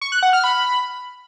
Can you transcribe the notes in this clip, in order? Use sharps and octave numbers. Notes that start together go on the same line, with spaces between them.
C#6
F#6
F#5
F6
B5